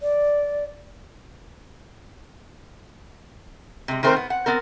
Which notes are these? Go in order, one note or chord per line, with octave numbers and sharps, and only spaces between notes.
D5
C3 G#3
D#3 A3 C4 F#4 A#4 C5
B3
F#5
B3 C4 A#4